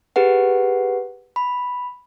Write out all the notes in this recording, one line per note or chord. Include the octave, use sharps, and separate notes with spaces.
G4 G#4 B4 F#5
B5